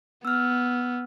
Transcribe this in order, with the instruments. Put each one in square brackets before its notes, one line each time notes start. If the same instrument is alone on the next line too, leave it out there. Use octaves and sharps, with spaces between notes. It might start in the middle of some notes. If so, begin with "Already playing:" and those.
[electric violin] B3 [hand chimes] E6 F6